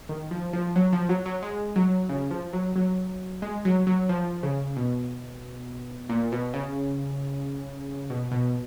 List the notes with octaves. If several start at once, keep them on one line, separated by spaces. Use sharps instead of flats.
D#3
F3
F3
F#3
F3
F#3
F#3
G#3
F#3
C#3
F3
F#3
F#3
G#3
F#3
F#3
F3
C#3
B2
A#2
B2
C#3
B2
B2